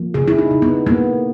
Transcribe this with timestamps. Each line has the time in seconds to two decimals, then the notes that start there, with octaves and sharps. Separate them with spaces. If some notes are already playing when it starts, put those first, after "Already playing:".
Already playing: F3 A#3
0.14 C#3 G#4
0.28 E4
0.38 D#4
0.51 C#3
0.62 B3
0.86 A#3 B3